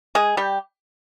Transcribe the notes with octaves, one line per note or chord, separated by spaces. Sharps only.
G#3 G#4
G3 G4